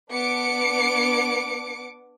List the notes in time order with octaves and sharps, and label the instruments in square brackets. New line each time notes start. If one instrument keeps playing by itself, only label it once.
[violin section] B3 D4 D6 C#7 D7